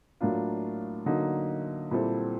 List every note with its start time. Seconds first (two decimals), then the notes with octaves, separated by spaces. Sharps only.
0.21 A2 F#3 A#3 D4 F4
1.06 D3 F#3 A#3 D#4
1.91 A#2 G3 C4 E4 A4